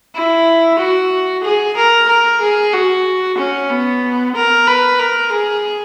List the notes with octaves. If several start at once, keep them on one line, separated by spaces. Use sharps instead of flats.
E4
F#4
G#4
A#4
A#4
G#4
F#4
C#4
B3
A#4
B4
A#4
G#4